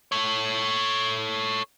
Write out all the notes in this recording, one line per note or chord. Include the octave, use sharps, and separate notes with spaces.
A4 C#5